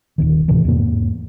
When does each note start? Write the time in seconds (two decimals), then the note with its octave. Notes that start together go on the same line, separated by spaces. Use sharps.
0.18 D#1 B1 D#3
0.48 D2 A2 C3 E3
0.65 E2 G#2 A#3